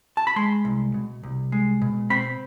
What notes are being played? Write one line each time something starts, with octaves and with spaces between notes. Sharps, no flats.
A5
B5
G#3 C6
C2
B2
C2
G#3
B2
C4 B5